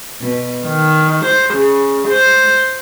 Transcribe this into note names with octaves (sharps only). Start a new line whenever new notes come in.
B2
D#3
C5
C#3
C5